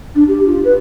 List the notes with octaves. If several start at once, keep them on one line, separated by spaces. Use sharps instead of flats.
D4
G4
F4
B4